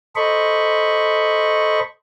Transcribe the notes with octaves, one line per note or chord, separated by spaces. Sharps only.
A4 C5 D#5 B5 C#6